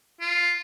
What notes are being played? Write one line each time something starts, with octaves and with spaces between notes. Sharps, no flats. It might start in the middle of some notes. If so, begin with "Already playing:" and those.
F4